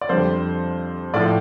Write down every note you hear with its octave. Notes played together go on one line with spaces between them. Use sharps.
D5
F2 D3 G3 C5
A2 F3 D5